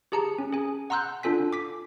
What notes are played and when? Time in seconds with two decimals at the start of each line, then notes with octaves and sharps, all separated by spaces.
0.12 G4 G#4 A5 A#5 C#7
0.38 C#4
0.53 G#4 G#5
0.90 F#5 A#5 C6 E6 F#6 G6
1.23 D4 F4 A4 G#5 B6
1.53 D6 B6